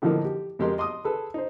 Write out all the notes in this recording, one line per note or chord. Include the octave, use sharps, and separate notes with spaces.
A2 D3 E3 F3 A#3 D#4
G4
F2 G#3 G4 A#4 C6
D#5 C6 D6 D#6
G#4 A4 B4
D#4 C5